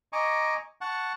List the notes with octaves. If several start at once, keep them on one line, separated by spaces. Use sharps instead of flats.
D#5 G#5 A#5 C#6 D6
F#5 A5 C#6